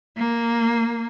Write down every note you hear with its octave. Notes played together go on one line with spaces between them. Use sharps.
A#3